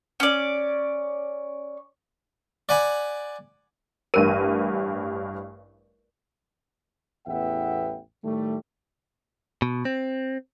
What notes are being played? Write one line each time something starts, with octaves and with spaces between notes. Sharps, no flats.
C#4 D5
D5 F#5 G#5 B5
A1 G2 A#4 D#7
A1 E2 B3 E5 F#5 G5
A2 D#3 G3 A3
B2
C4